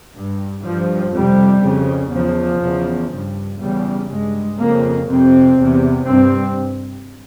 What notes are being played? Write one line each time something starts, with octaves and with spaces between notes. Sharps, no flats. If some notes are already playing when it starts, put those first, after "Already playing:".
G2
G2 F3
F2 C3 G3
F2 C#3
E2 C#3 F3
E2 C#3
G2
E2 C#3 G3
G2 G#3
F2 C#3 A#3
F2 C3 C4
E2 C3
G2 C4